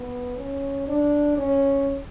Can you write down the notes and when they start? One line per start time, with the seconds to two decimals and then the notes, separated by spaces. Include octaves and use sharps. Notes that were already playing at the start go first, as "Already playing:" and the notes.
Already playing: B3
0.37 C#4
0.88 D4
1.38 C#4